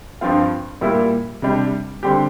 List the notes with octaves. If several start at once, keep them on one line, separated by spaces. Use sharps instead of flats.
G2 F3 C4 F4
A#2 G3 A#3 E4
C3 G3 D4
D3 G3 C4 G4